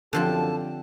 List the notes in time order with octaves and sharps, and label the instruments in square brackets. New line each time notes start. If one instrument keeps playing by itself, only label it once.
[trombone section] F#2 G4 A4 [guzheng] D3 F3 C4 [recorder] A5